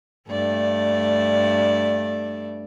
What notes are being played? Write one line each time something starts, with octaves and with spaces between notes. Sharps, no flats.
G2 A3 D5